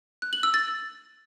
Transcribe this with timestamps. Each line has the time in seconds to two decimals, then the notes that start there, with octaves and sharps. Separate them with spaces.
0.22 F#6
0.33 F#7
0.43 E6
0.54 A6